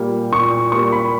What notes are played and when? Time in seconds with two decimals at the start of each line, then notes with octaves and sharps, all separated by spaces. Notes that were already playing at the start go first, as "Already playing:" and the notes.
Already playing: A#2 G3 A#3
0.32 A#2 C#6
0.72 G3 A#3 C#6
0.92 B5